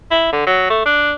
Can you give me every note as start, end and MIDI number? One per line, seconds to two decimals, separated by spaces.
0.11 0.32 64
0.32 0.44 50
0.47 0.70 54
0.70 0.81 57
0.86 1.12 62